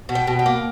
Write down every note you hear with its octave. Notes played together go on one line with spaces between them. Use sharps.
B2
G5
B2
G5
A#3